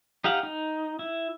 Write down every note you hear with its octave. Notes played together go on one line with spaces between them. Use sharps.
D#4 G4 F5 F#5
D#4
E4